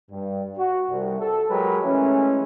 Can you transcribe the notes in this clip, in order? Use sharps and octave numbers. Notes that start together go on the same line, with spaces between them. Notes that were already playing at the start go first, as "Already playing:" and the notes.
G2
F#4
C2
A4
F#3 G#3 G4 A#4 B4
E3 G#3 A3 C#4